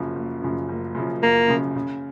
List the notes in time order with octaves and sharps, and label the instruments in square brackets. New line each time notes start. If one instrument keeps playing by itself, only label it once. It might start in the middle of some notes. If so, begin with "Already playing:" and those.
Already playing: [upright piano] F#1 F#2 C#3 F3
F#1
F#2 C#3 F3
F#1
F#2 C#3 F3
[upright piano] F#1 [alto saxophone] A#3
[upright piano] F#2 C#3 F3
C#3